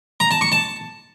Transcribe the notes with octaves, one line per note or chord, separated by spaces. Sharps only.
A#5
A5
C#6
A5